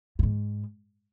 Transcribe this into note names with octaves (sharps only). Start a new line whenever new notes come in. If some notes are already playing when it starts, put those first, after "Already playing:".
G2
G#2